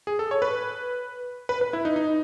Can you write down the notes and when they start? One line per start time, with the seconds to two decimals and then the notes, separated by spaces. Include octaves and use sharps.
0.07 G#4
0.19 A4
0.31 C#5
0.42 B4
1.49 B4
1.61 B4
1.73 E4
1.85 D#4
1.96 D#4